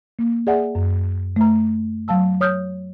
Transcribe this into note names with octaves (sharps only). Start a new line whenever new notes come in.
A#3
G#4 D5 E5 F#5 G#5
F#2
A3 A#5
F#3 F5 A5 E6
C#5 D#6 F6 G6